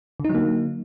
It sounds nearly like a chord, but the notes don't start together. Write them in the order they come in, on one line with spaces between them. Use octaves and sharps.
D3 D#4 F#3 A#3